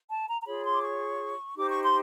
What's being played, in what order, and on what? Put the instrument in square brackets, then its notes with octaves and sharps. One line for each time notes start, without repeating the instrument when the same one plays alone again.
[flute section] A5
A#5
A#5
F4 G#4 C#5 B5
C6
D6
C#6
D#4 G4 C5 D6
C#6
C6